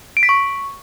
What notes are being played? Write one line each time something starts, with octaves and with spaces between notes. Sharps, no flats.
D7
B6
C#6